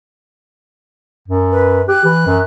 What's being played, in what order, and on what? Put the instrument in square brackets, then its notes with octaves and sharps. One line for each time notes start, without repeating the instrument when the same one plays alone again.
[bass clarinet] F#2
[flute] B4
[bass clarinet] G4 [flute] F#6
[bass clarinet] E3
F#2